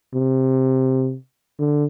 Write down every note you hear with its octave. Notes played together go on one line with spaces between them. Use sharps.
C3
D3